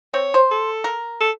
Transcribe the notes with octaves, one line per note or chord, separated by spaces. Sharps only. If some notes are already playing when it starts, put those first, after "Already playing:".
C4 C#5
C5
A4
A#4
A4